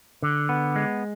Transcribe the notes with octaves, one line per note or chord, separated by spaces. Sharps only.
D3
B3
G#3